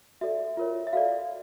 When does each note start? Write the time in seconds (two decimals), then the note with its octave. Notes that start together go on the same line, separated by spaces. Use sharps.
0.21 F#4 A4 D5 E5
0.57 F4 A#4 C#5
0.87 E5
0.93 F#4 A4 D5 F5